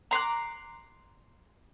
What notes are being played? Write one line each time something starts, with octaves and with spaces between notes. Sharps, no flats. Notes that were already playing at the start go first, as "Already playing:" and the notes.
A#5 C6 D6 F#6